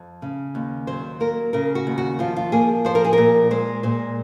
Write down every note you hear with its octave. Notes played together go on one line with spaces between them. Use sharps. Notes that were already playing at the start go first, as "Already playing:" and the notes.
Already playing: F2
C#3
D#2
F#3 C5
A#3 A#4
C#3 A#4
F#4
D#2
F#4
F3 F4
F4
A#3 G#4
F3 C5
A#4
G#4
A#4
A#2
G#3 C5
A#2 C5